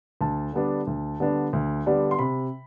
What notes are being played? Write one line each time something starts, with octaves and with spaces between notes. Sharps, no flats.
D2 A5
D3 G3 B3 D4
D2
D3 G3 B3 D4
D2
D3 G3 B3 D4
C6
C3 B5